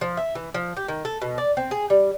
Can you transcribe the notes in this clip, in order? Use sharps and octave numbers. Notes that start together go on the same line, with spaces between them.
F3
E5
E3
F3
G4
D#3
A4
B2
D5
C4
G#4
G3